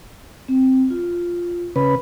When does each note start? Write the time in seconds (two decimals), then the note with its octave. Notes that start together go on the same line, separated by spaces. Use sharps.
0.48 C4
0.90 F4
1.76 C#3 B4 B5